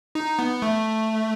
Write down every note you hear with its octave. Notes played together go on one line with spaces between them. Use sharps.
D#4
B3
A3